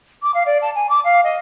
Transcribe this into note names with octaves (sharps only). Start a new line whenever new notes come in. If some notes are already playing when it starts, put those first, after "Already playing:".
D6
F5
D5
A5
G#5
D6
F5
D#5